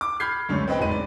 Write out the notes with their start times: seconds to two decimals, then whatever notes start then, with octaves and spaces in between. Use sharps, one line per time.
0.01 D6
0.20 B5 F6 G6 G#6 C7
0.49 C#2 F#2 D3 A3 C#4
0.67 C4 B4 D#5 G5
0.79 E1 A#1 G#2 B4 D#5 D#7
0.91 D5